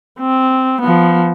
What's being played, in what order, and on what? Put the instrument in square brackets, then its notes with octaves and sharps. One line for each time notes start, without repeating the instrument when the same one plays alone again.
[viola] C4
F3 B3